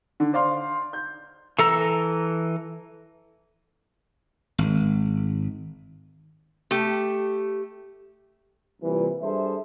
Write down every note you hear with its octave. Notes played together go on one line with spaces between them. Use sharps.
D3
C5 D5 F5 C6
G6
E3 A4 A#5 E6
G#1
A3 G4
C2 A#2 E3 B4
G3 D4 G#4 A4 C5 E5